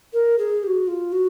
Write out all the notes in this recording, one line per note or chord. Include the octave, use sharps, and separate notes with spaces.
A#4
G#4
G4
F#4
F4
F#4